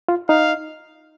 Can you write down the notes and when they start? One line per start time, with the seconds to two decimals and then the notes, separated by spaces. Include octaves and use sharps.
0.08 F4
0.29 D#4 F5